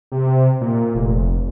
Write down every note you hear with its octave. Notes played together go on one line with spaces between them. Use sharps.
C3
A#2
F1